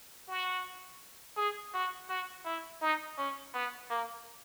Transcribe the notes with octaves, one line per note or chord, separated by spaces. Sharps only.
F#4
G#4
F#4
F#4
E4
D#4
C#4
B3
A#3